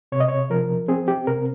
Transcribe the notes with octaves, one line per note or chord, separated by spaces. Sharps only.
C3 C#5
D#5
C#5
F3 A#4
C4 G#4
G4
C3 A#4